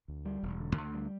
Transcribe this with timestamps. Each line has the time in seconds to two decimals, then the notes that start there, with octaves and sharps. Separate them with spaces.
0.08 D2
0.25 G3
0.43 E1
0.60 D3
0.78 D2
0.94 G3